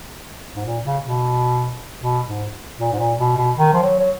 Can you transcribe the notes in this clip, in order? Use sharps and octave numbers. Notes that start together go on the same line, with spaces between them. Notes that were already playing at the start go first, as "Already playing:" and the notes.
G#2
A#2
C#3
B2
B2
G#2
A#2
G#2
A#2
B2
B2
D#3
F3
F#3
F#3